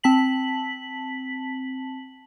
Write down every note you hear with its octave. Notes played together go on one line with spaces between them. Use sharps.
C4 A5 B6 F#7